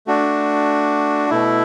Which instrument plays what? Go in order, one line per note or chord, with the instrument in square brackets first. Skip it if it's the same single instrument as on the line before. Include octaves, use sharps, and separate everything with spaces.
[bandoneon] A3 D4 F#4
B2 A3 E4